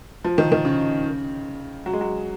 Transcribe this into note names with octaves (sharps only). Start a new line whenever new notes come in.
F3
D#3
D#3
C#3
F#3
G#3
F#3